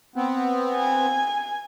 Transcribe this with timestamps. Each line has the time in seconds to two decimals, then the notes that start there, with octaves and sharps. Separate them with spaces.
0.16 B3 C4
0.74 G#5